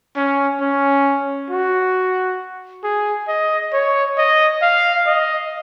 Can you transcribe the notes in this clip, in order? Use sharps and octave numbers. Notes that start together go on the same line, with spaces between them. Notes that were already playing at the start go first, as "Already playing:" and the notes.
C#4
C#4
F#4
G#4
D#5
C#5
D#5
F5
D#5